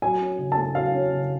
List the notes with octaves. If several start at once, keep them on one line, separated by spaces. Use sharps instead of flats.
F#3 G#5
C#4
C#3
A5
A3
F#3 F5
C#4
C#3